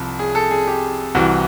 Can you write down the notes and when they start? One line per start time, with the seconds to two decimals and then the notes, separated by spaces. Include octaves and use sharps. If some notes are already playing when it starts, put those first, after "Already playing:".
Already playing: C2 C3 F3
0.19 G#4
0.35 A4
0.51 G#4
0.67 G4
1.15 C2 C3 E3 F#4